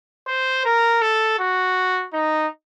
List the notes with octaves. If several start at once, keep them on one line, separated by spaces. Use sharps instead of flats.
C5
A#4
A4
F#4
D#4